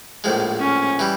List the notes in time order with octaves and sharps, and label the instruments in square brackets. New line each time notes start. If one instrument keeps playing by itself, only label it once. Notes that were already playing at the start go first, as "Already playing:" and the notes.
[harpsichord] A#1 A2 F3 G#3
[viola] C#4
[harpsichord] E3 G3